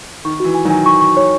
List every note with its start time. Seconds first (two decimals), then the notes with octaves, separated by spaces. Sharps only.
0.25 D#3 C#6
0.40 E3 F#4
0.55 G#5
0.65 D#3 F#3 G#5
0.86 C#6
1.01 C#6
1.17 C#5